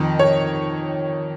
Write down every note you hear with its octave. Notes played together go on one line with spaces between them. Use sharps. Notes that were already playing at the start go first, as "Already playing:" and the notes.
Already playing: F2 D#3
C#5